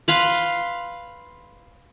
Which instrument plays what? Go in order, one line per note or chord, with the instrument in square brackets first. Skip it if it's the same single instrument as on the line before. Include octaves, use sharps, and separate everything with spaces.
[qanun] B4 F5 C6